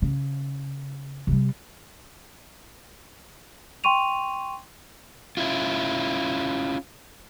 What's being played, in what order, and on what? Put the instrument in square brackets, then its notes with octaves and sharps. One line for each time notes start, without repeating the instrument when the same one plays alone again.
[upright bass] C#3
C3 G3
[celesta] G5 C6 C#6 D#7 F7
[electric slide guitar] C#4 E4 F4